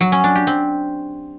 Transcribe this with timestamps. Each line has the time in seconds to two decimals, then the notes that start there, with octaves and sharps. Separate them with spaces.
0.01 F#3
0.12 C#4
0.24 D4
0.35 G4
0.47 C4